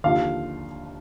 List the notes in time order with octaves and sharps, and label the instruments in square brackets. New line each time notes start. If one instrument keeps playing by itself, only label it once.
[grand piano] D#2 D3 F3 F5